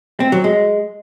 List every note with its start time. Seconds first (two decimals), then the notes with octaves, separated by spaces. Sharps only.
0.20 C4
0.32 F#3
0.44 G#3